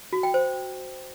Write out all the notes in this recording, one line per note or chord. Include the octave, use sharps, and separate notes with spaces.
F#4
G5
C5